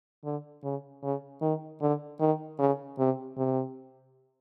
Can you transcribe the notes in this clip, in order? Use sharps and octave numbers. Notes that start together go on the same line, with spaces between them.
D3
C#3
C#3
D#3
D3
D#3
C#3
C3
C3